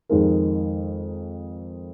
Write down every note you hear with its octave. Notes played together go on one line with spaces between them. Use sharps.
F2 D#3 G#3 D#4 A#4